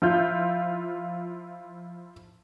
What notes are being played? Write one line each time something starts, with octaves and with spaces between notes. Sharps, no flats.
F3 E4 F4 G6